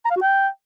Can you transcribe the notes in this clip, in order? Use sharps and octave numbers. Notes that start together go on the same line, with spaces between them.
A#5
F5
F#4
G5